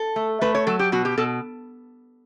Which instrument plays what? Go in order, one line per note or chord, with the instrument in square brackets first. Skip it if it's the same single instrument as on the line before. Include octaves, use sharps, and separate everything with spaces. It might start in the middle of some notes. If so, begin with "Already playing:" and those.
Already playing: [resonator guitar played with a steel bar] A4
A3
A3 B4
C#5
F#3 A4
G4
B2 F#4
G4
B2 A4